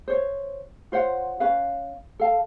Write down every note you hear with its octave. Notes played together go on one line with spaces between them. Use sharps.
C5 C#5
F4 C5 C#5 F#5
C#4 B4 F5
A4 F5 A5